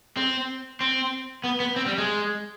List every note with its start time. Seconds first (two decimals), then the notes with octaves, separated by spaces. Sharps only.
0.17 C4
0.81 C4
1.44 B3
1.60 B3
1.76 C4
1.86 G3
1.98 G#3